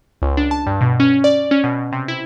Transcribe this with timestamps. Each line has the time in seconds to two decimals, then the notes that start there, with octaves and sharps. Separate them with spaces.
0.22 C#2
0.37 D4
0.51 A5
0.66 G2
0.81 B2
1.00 C#4
1.24 D5
1.51 C#4
1.64 B2
1.92 C3
2.08 E4